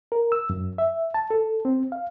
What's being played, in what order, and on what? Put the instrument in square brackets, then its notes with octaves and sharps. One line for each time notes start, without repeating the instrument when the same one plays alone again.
[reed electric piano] A#4
E6
F#2
E5
A5
A4
C4
F5